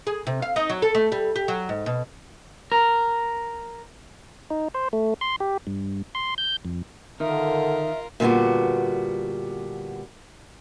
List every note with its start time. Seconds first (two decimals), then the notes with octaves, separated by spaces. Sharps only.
0.07 G#4
0.27 C3
0.42 F5
0.56 D#4
0.70 F#3
0.82 A4
0.95 A3
1.12 G3
1.36 G4
1.48 F#3
1.69 G#2
1.86 B2
2.72 A#4
4.50 D#4
4.74 C5
4.93 A3
5.21 C6
5.40 G4
5.67 G2
6.15 C6
6.38 G6
6.65 F2
7.20 D3 D#3 F4 A#4 E5
8.20 A#2 D3 G3 B3 F#4